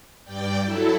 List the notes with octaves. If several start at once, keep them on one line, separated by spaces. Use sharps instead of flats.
G2 D5 G5
F#3 E4 A4